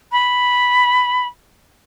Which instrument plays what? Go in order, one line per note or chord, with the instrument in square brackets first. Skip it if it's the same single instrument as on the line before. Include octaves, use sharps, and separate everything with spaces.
[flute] B5